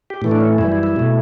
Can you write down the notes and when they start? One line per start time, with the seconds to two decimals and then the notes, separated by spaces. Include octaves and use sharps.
0.10 G4
0.22 A2 E3 A3
0.31 D4
0.41 C#4
0.58 F#2 E3 G3 E4
0.72 E4
0.83 E4
0.96 B2 A3